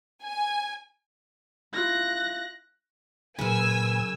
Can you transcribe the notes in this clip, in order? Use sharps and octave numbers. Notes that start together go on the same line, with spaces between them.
G#5
E4 F4 F#6 A#6
F#2 A#2 C#3 B4 G#5 E6